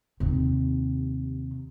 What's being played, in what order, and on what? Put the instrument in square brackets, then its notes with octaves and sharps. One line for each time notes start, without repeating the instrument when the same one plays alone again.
[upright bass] D#2 C3